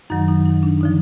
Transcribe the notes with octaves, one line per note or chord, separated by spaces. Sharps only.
F#2 D#3 F#3 D#4
D#4
D#4
D4
D3 F3 D#4